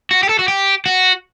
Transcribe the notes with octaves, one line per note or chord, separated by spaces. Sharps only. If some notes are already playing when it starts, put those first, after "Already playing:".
F#4
G4
A4
F#4
G4
F#4